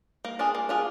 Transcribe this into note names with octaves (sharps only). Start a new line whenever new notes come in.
A#3
D4 F4 G#4
A#3
D4 F4 G#4